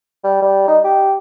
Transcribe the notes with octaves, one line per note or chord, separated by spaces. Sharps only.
G3
G3
D#4
G4